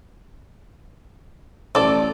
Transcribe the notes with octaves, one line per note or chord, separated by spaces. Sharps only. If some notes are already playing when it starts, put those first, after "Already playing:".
A1 A4 D5